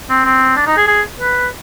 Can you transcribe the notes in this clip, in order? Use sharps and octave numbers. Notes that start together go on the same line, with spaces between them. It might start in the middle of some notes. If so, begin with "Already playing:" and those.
C4
C4
D4
D#4
G#4
G#4
B4